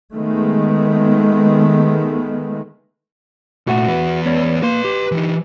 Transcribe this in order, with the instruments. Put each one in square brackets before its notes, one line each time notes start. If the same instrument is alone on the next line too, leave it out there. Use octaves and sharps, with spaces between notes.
[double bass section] D#3 G#3 A3 B3
[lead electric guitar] A#2 A3 [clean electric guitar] F#4 E5 F#5
[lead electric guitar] E2 B4
[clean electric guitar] B3 C#5 D5
[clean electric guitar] A#3 [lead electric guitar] B4 C6
[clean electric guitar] G4
[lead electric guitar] E3 D#4